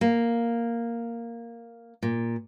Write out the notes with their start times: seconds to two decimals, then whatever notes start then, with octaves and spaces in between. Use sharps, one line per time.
0.01 A#3
2.03 A#2